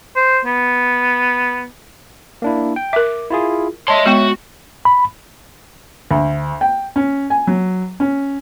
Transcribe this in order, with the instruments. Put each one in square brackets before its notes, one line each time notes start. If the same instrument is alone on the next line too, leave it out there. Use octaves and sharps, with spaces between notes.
[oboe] C5
B3
[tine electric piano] A#3 D4 E4
G5
[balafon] A#4 E5 [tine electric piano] D6
[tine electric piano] E4 F4 G#4
[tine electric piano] C#5 E5 [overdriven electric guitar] D#5 C6 [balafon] A5
[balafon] G#3 B3 G5 [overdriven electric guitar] F#4
[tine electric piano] B5
[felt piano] D2
G5
C#4
G#5
F#3
C#4